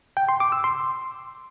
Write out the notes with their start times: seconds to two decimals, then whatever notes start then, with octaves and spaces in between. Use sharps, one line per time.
0.17 G5
0.29 C6
0.40 D6
0.52 E6
0.64 C6